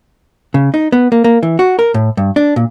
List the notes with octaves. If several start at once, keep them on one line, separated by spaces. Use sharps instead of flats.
C#3
D#4
B3
A#3
A#3
E3
F#4
A#4
A2
G2
D4
A#2